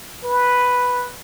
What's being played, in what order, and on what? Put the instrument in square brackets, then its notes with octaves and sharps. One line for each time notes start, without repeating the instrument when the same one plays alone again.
[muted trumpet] B4